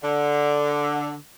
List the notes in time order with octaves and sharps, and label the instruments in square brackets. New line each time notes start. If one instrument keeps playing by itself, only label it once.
[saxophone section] D3